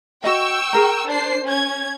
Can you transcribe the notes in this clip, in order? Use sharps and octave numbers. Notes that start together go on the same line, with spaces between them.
F#4 D#5 G5 C#6 E6
G#4 A#4 A#5
D4 C5 C7
C#4 G#6